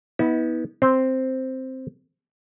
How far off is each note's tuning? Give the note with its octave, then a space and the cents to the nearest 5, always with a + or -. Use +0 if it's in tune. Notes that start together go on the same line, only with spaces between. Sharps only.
B3 -10 E4 -45
C4 +0 C5 +0